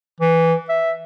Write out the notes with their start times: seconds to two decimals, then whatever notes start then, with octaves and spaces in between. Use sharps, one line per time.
0.20 E3
0.69 E5